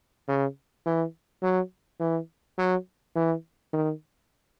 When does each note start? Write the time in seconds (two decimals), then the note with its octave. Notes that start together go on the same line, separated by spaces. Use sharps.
0.28 C#3
0.86 E3
1.43 F#3
2.00 E3
2.58 F#3
3.16 E3
3.73 D#3